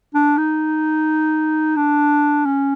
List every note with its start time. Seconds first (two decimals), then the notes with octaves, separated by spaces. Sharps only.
0.14 D4
0.37 D#4
1.76 D4
2.45 C#4